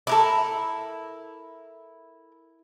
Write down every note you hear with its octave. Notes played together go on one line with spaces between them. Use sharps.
E4 A4 A#4 D6